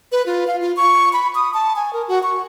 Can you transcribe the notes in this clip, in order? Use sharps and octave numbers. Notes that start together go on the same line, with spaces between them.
B4
F4
F5
F4
C#6
B5
D#6
A5
G#5
A#4
F#4
C#6